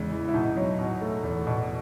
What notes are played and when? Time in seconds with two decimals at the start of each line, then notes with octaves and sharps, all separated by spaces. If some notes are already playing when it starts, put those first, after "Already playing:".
Already playing: E2 C#3 G#3
0.12 E3
0.28 E4
0.34 B2 D#4
0.57 F#3
0.79 B2
1.01 A3
1.24 E2
1.47 B2